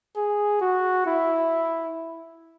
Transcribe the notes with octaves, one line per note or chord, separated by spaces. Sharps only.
G#4
F#4
E4